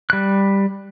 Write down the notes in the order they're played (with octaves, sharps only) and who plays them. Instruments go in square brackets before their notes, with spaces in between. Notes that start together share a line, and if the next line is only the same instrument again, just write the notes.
[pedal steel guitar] G3 F#6